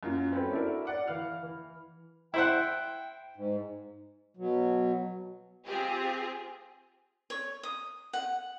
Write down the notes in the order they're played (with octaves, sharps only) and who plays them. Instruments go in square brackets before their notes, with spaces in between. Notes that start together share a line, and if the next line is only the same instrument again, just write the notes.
[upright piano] F#2 A#3 F4
C4 C#4 F#4 A4 B4 G5
D4 E4 F#4 A4 A#4
D5 F#5 D6
E3 F5 F6
E3
[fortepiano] E4 C5 F#5 [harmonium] G5
[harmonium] G#2
B2 F#3
[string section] C4 F4 G4 G#4
[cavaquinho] C#5
D#6
F#5